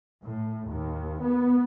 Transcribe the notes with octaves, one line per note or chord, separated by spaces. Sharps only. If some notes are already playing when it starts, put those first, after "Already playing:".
A2
D#2
B3